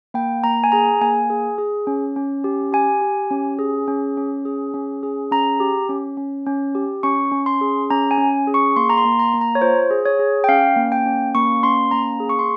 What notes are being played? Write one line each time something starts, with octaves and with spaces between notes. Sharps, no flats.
A#3 G5
A#3 A#5
G#5
G#4 A#5
A#3 G#5
G#4
G#4
C#4
C#4
G4
G4 G#5
G4
C#4
G#4
C#4
C#4
G#4
C#4
G#4
C#4 A#5
G4
C#4
C#4
C#4
G4
C#4 C#6
C#4
C6
G#4
C#4 A#5
G#5
C#4
G#4
C#6
A#3 C6
A#5
C6
A#3
A#5
A#3
A#5
C#5
F4 C5
G#4
C#5
G#4
G5
C#4 F5
A#3
G5
C#4
A#3 C#6
C#4 C6
A#3 A#5
G#4
C#6
C6